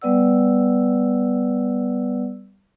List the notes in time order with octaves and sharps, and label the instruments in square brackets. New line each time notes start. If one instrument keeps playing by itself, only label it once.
[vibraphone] G3 B3 B4 D5 F#5 E6